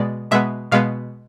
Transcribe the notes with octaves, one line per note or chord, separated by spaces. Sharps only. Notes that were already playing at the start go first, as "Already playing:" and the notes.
Already playing: B2 G#3 B3 D5
B2 G#3 B3 E5
B2 G#3 B3 F5